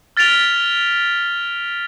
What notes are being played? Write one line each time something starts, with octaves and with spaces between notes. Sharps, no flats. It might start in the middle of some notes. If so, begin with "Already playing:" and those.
F6 A6 B6 D7 F7 G7